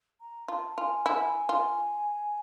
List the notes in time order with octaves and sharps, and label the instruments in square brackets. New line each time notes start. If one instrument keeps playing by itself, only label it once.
[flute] A#5
[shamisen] F4 [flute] A5
[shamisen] F4 [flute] G#5
[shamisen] E4
F4